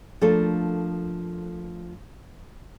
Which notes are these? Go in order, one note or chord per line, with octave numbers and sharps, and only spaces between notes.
F3 A3 A#3 D4 A4